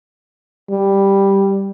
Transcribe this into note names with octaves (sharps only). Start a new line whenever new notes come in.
G3